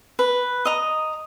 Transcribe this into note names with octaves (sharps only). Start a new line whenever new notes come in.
B4
D#5 A#5 D#6